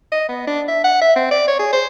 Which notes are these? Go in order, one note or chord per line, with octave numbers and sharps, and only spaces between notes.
D#5
B3
D4
E5
F#5
E5
C4
D5
C#5
G#4
C5